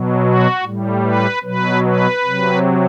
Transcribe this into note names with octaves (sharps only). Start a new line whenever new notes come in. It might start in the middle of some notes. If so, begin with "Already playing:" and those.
Already playing: B2 F#3
F#4
A2 G3
B4
B2 F#3 B4
B4
C3 F#3